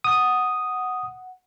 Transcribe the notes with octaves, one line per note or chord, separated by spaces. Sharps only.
F#5 D#6